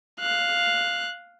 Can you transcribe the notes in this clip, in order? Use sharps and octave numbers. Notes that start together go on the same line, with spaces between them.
F5 F#6